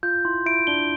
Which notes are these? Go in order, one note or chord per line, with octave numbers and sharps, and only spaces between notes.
F4 G6
E4 C6
E4 D7
D4 G7